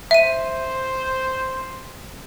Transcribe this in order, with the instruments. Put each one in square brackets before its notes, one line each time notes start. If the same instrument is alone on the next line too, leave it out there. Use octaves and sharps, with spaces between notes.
[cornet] C5 [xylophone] E5 D#7